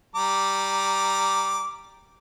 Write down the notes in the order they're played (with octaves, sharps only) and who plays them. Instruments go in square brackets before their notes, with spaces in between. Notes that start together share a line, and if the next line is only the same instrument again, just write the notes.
[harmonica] G3 A#5 D6